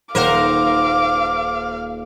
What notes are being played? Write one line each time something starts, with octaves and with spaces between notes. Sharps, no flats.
D#1 A#3 A#4 C5 F5 F#5 D6